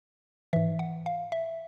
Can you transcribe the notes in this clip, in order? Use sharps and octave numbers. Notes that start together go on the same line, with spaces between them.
G#2 E3 E5
F#5
F5
E5